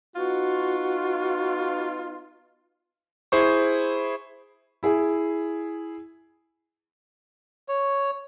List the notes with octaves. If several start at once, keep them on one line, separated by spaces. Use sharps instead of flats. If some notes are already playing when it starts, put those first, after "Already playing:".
B3 D#4 F4 F#4
E4 G#4 C5 C#6
E4 G#4
C#5